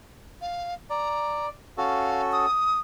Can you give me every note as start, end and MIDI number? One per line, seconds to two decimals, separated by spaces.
0.41 0.74 77
0.90 1.49 74
0.90 1.46 82
1.77 2.46 61
1.77 2.46 66
1.77 2.46 69
1.77 2.22 77
2.32 2.80 87